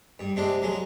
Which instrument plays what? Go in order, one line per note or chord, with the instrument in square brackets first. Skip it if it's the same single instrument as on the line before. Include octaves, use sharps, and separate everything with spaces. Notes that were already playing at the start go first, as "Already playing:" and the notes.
[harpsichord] G2
C3 G#3 D4
F#3 G#3